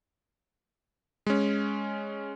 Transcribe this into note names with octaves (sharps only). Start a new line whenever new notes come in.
G#3 C#4